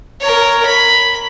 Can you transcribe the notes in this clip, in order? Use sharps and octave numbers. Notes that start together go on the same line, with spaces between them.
A#4 C#5
B5